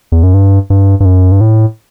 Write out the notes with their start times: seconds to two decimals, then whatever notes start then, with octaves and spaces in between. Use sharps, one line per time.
0.12 E2
0.23 F#2
0.34 G2
0.70 G2
1.00 G2
1.05 F#2
1.32 G2
1.41 A2